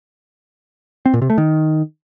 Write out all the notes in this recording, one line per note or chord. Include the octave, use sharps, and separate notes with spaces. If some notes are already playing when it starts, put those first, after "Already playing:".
C4
A#2
C3
A3
D#3